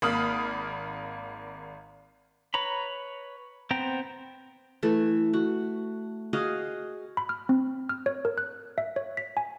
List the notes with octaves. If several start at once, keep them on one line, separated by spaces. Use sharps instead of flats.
G#1 A#3 B5 D#6 F6 F#7
B4 C#5 A#5 B5
B3 C4 C5 G5 A#5
E3 A3 A4
F#4
F#4 G#4 D#5 F5
B5
F6
C4
F6
C#5
A#4
F#6
E5
C#5
B6
G#5